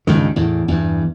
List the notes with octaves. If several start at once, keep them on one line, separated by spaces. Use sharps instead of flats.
C#2 G2 D#3
E2 A2
E2 G2